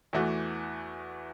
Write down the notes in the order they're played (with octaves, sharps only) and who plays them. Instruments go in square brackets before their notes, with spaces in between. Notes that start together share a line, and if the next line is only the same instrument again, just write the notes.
[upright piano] E2 E3 A3 F#4